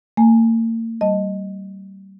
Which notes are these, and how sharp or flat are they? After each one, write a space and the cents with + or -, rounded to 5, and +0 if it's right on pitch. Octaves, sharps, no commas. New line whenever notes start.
A#3 -45 G#5 +0
G3 -25 D#5 +0 A5 +0